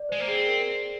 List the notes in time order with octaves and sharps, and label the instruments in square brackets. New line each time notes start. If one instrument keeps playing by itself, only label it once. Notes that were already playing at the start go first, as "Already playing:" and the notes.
Already playing: [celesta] D5
[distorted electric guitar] G#3 [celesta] C5
[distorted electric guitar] A#3
[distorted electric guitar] C4 [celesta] G#4
[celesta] A#4